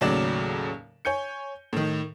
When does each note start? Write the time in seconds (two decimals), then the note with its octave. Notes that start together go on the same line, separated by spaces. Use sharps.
0.01 D#2 A2 C#3 F#3 D5 E7
1.05 C#5 G#5 G6 C#7
1.73 A2 D#3